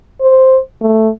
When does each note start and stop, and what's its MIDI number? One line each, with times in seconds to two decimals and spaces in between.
0.21 0.59 72
0.82 1.09 57